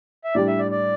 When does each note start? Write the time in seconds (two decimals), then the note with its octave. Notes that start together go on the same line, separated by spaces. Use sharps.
0.24 E5
0.35 A2 G3 D4 G4 D5
0.47 E5
0.59 D5
0.71 D5